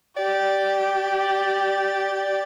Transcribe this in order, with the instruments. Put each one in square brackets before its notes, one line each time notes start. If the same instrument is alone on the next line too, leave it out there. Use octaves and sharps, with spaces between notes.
[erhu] G4 [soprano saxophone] D5